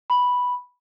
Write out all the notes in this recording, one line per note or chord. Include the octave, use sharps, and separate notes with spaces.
B5